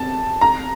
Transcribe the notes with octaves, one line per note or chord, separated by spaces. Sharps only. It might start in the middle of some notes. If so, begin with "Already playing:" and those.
Already playing: A5
A#5